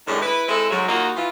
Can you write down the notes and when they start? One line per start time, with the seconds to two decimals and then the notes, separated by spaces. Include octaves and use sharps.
0.07 F#2 A2 D#3 G#3 D4
0.22 E4 B4
0.49 G#3 C4 E4 A4
0.71 G#2 C#3 F#3
0.88 D#2 A#3 D#4 F4 F#4
1.16 E3 F4